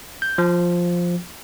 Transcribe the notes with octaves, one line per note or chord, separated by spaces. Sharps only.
G6
F3